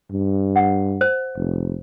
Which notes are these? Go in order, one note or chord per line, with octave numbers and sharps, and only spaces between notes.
G2
F#5
C5
F1